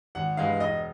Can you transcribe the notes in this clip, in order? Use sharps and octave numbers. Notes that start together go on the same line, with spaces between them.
G#1 F#5
G2 E3 G#3 F5
E1 D#5